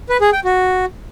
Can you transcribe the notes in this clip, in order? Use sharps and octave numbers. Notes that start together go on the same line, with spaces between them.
B4
G#4
G5
F#4